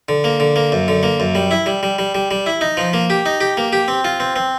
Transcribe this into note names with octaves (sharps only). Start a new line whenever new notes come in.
D3
A#3
D3
A#3
F#2
D3
A#3
F#2
G3
E4
G3
G3
G3
G3
G3
E4
D#4
F3
A#3
G4
D#4
G4
A#3
G4
C4
F4
C4
C4